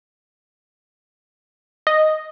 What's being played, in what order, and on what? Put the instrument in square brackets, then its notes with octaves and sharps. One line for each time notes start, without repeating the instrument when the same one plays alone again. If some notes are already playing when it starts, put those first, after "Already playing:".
[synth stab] D#5